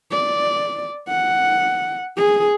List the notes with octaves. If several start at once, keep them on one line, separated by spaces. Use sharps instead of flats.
D5
F#5
G#4